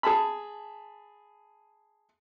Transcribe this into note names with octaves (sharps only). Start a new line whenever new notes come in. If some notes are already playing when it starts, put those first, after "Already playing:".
G#4 A5 B5